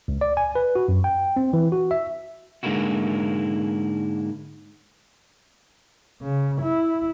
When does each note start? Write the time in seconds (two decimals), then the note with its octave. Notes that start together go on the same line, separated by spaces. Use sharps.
0.08 C#2
0.21 D5
0.37 G#5
0.55 B4
0.75 F#4
0.88 F#2
1.04 G5
1.36 C4
1.53 E3
1.72 F#4
1.91 E5
2.63 G#2 D3 G#3 A#3 E4 F#4
6.22 C#3
6.61 E4